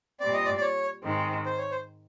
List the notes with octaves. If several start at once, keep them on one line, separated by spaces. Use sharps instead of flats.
A#2 G3 C4 D5
D#5
D5
D5
C#5
G#2 D#3 G#3 C4
C5
C#5
C5